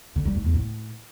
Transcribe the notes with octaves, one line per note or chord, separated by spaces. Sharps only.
D3
G3
G#2
E2
A2